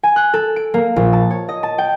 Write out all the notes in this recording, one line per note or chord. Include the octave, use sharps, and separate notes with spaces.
G#5
F#6
A4
D7
A#3
A#1
A5
C#5
D#5
A5
G5